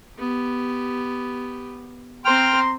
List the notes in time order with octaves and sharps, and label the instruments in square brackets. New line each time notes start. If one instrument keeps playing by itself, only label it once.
[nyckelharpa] B3 G4
[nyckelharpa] C4 C5 [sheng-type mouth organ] G5 F6 [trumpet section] A#5 C6